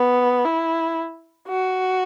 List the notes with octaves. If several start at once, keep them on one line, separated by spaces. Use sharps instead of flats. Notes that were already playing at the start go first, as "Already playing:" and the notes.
Already playing: B3
E4
F#4